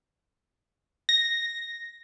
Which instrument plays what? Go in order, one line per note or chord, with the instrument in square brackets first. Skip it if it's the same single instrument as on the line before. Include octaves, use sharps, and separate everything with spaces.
[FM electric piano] A#6